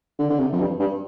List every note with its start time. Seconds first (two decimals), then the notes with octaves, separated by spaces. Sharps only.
0.19 D3
0.30 D3
0.39 C3
0.52 F2
0.60 G2
0.79 G2